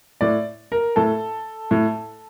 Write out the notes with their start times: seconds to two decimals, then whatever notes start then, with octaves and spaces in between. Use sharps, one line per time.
0.21 A2 D5
0.72 A#4
0.96 A2 A4
1.71 A2